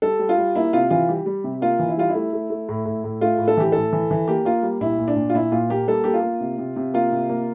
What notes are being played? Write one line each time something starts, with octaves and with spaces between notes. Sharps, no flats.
G3 A4
G3
F4
G3
A#3 E4
C3 F4
E3 F4
G3 G4
G3
C3
A#3 F4
E3
E4
G3 F4
E4
A3
A3
A3
A2
A2
A2
A3 F4
A2
A4
E3 G4
A2 A4
E3
E3
A#3 G4
A#3 F4
G3
A#2 E4
A#2
D4
A#2
F4
A#2 E4
A#2 F4
A#3 G4
G3 A4
A#3 G4
F4
A#3
C3
C3
C3
A#3 F4
C3
A#3